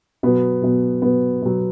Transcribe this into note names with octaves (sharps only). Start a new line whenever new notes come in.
B2 F#3 B3
B2 F#3
B2 F#3 B3
B2 F#3